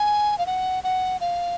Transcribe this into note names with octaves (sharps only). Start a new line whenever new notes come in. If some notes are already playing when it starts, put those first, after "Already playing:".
Already playing: G#5
F5
F#5
F#5
F5